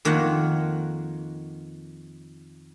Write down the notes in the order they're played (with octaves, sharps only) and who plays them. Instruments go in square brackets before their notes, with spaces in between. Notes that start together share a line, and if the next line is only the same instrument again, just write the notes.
[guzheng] F2 D#3 A#3 F4 C#5 F#5